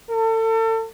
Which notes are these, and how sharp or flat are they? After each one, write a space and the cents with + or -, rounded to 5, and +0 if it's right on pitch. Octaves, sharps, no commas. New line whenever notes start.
A4 +35